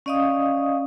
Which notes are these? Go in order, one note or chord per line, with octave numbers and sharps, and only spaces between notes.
C#4 D5 D#5 F5 D#6